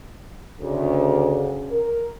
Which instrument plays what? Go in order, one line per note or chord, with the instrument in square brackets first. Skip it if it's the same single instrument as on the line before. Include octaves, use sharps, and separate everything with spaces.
[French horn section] D2 [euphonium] C#3
[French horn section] A#4